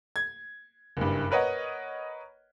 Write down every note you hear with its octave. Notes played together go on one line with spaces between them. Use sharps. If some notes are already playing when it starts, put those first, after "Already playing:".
G#6
F#1 G2
A#4 B4 C#5 D#5 F#5